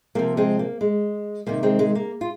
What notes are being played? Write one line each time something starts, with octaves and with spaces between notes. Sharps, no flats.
C3 F3 A#3
G#3 C4
A#3
G#3
C3 D#3 A#3
G#3 C4
G#3
A#3
F4